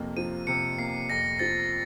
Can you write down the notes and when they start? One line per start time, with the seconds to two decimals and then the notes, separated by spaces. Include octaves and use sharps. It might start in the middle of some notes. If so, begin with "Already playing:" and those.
Already playing: F2 C3 A#3
0.17 F3 D#7
0.47 C3 C#7
0.78 A#3 C7
1.10 F2 A#6
1.39 F3 A6